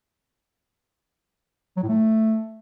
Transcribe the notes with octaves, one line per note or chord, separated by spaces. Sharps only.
F#3
A2
A3